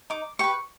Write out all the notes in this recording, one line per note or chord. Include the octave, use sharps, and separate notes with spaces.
D#4 D6
G4 B4 C#6